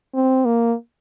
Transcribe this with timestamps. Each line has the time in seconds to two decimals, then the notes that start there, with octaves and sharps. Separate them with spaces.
0.14 C4
0.45 A#3